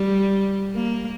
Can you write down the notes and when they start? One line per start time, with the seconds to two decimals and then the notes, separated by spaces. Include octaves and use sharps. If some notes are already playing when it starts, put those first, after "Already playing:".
Already playing: G3
0.75 A#3